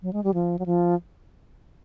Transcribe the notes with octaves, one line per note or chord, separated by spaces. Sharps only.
F#3
G#3
G3
F3
F#3
F3